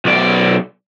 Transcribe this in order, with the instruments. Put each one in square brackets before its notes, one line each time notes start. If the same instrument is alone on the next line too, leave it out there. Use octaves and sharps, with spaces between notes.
[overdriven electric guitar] B1 D5